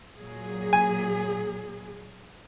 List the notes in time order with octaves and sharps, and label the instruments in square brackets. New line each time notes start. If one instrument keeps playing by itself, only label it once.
[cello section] A#2 F#3 G#4
[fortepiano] G#5